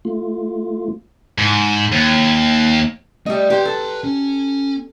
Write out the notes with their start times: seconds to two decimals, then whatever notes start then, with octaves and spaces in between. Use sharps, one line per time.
0.05 A3 F4
1.38 G#2
1.92 D#2
3.26 G3 A3 D#5
3.50 G4 B4 C6
3.65 A4
4.04 C#4